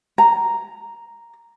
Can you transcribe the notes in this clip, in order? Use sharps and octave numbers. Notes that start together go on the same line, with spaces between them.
A#5